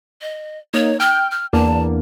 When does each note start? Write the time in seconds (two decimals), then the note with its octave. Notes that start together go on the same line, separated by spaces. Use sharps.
0.22 D#5
0.74 A#3 D#4 C#5
1.00 G5 F6
1.31 F6
1.53 E2 A#3 D4 A5